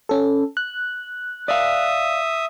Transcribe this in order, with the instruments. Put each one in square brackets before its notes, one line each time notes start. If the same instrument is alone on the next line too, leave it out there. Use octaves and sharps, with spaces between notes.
[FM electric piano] C#4 A4
F#6
[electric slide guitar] D5 F5 [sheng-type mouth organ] E5 D#6